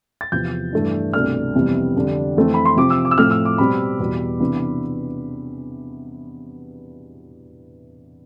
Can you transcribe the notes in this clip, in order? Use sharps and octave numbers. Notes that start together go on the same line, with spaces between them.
A6
E2 C3 F3 C4 G6
G2 E3 A3 D4
C2 B2 A3 D4 F6
F2 C3 E3 G3 B3
F2 D3 G3 D4
F2 E3 A3 C4
B5
C6
C3 F3 C4 D6
E6
D6
E6
A2 F3 A3 C4 F6
E6
D6
B2 G3 C4 B5
E2 B2 G3
C3 E3 B3 D4